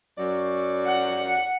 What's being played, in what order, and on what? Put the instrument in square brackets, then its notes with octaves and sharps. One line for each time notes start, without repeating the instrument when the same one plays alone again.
[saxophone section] F#2 F#3 D5
[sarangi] F#5